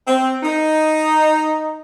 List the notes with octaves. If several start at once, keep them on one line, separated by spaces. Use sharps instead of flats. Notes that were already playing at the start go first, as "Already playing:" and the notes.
C4
D#4